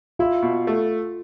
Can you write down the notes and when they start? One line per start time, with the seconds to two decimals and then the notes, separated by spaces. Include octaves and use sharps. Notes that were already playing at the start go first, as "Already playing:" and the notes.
0.19 E4 F4
0.42 B2
0.67 A3